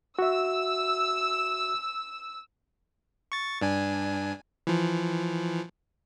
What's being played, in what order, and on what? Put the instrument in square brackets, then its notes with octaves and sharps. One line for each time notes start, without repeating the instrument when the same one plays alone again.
[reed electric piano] F#4 E5 [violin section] E6
[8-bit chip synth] C#6 A6
G2 D4 G#5
E3 F3